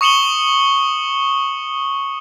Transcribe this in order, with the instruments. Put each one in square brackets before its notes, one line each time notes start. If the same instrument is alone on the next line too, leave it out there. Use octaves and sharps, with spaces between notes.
[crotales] C#6 D#6 C#7 E7 F#7 G7